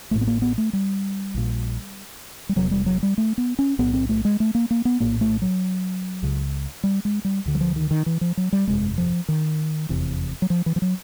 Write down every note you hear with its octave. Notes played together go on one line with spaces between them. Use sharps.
A1 A2 A3
B3
A#3
B3
A3
G3
A#1 A#2
G3
E1 E2 C3 F#3
G3
F#3
G3
A3
B3
C#4
B1 A2 B3
C4
A3
G#3
A3
A#3
A#3
B3
A#1 A2 A#3
A3
F#3
C#2 C#3
G3
G#3
G3
D2 D3
F#3
F3
D#3
D#3
E3
F3
F#3
G3
G1 F2 C3 G#3
F3
D#3
F1 E2 C3
F#3
F3
E3
F3
F#3